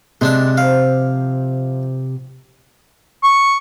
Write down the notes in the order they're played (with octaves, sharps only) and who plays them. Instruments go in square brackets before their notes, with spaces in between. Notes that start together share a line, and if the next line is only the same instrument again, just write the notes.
[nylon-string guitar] C3 [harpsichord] G#3 D4 A5
[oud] F3 [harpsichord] F5
[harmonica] C#6